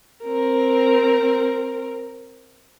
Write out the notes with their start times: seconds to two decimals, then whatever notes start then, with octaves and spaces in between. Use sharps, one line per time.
0.24 C4 A#4